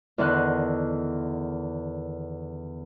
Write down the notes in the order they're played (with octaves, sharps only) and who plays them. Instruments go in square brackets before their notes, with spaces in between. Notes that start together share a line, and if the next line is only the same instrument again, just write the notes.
[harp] E2 D3 D#3 F#6